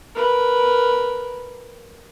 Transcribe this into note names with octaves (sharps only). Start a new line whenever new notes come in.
A#4 B4